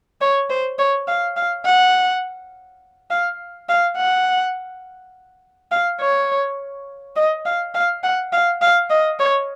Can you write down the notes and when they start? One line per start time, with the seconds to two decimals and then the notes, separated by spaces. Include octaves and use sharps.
0.21 C#5
0.50 C5
0.79 C#5
1.08 F5
1.37 F5
1.65 F#5
3.11 F5
3.69 F5
3.97 F#5
5.71 F5
6.01 C#5
7.16 D#5
7.46 F5
7.74 F5
8.04 F#5
8.33 F5
8.62 F5
8.90 D#5
9.19 C#5